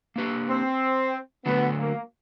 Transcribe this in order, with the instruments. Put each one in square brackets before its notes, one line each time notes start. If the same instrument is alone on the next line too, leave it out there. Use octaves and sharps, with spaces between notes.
[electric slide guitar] A#3 D4 G4 B4
[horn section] C4
[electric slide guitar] D3 F#3 A3 D4 [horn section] B3
[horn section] A#3